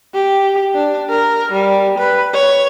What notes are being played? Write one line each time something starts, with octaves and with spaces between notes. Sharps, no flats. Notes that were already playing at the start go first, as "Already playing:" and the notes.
G4
D4
A#4
G3
B4
C#5